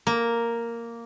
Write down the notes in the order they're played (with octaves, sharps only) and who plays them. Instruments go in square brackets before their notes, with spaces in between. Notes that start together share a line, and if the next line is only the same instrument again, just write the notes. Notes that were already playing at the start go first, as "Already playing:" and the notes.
[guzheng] A#3